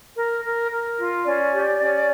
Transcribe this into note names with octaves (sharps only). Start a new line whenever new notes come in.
A#4
A#4
A#4
F4
C#4 D5
G4
C#4